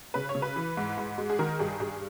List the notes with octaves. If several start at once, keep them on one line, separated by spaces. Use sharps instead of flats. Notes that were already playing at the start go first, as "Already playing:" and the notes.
C#3 B4
C#5
C#3
B4
E3
G#2
G#2
G#3
G#4
D#3 A#4
G2 G#4
G2 G#4